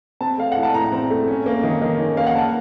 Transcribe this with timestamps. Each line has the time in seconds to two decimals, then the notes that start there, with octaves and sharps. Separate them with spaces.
0.21 C4 A5
0.38 A3 F5
0.52 A2 F#5
0.63 A5
0.74 A2 A#5
0.92 C4
1.10 A3
1.28 C#4
1.46 A#3
1.63 D#3
1.82 D#3
2.00 C#4
2.17 A#3 F5
2.27 F#5
2.35 A#3 A5